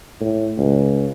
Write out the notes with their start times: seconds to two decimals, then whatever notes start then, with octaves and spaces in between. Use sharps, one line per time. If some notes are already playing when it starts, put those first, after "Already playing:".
0.20 A2
0.57 C#2